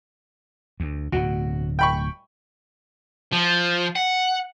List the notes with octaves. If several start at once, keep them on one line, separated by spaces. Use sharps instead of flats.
D2
D1 D2 B2 F#4
G5 B5 C#6
F3
F#5